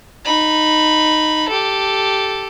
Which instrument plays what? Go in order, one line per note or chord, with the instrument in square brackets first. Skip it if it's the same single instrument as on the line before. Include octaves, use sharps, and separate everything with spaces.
[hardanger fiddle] D#4 B5
G4 A4